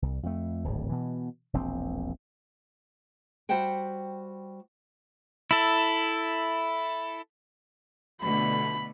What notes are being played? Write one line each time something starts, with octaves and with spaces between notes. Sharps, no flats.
C2
F2 A3
D1 G#1 D2
B2 E3
E1 A#1 C4
G3 F#4 C5 E5 F#5 G5
E4 A4
B2 D3 A3 B5